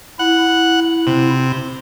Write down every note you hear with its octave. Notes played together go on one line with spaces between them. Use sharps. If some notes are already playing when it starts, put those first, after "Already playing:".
E4 F#5
C3